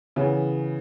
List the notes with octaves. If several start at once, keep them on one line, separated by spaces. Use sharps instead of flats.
C#3 E3 B3